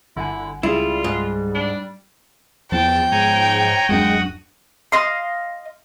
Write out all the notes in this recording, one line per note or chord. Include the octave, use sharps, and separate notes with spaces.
G1 D3 E4 F#5 G#5
C#2 G3 E4 F4 G#4
G#2
D4
E2 F3 B3 G5 A5
G#2 C#5 G#5 A#5
D1 F#2 G#3 D4 F#4 F#5 D#6
D#5 F5 C6